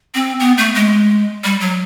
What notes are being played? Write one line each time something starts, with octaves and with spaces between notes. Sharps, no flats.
C4
B3
A3
G#3
G3
F#3